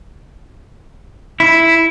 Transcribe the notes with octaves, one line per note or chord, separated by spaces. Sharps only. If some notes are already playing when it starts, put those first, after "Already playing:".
E4